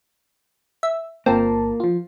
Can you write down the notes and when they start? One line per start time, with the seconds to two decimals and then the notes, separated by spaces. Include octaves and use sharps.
0.83 E5
1.26 G1 A#3 C4 F4 A5
1.80 F3 F4